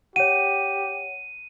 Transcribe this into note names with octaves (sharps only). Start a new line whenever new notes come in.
G4 C#5 F#5 D#7